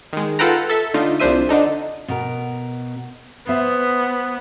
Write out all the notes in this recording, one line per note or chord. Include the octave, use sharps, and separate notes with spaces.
D#3 G#3
F4 A4 B4 F#5 G5 A#5
A4 E5
D3 A3 D#4 F4
C2 F3 D4 C5 E5 D#7
D3 D4 D#4 A4
B2 A#4
B3 C5 E5